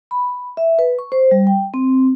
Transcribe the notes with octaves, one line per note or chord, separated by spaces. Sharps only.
B5
E5
B4
C#6
C5
G3
G5
C4